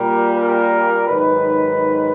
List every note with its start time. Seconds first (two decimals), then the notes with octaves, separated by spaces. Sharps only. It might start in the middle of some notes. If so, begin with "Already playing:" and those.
Already playing: A#2 G3 A#4
0.34 A#4
1.07 G#2 D#3 F#3 B4